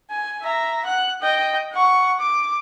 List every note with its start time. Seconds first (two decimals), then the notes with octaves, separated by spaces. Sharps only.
0.10 G#5
0.42 E5 A#5
0.85 F#5 F#6
1.21 D#5 G5
1.73 F#5 C#6
2.20 D6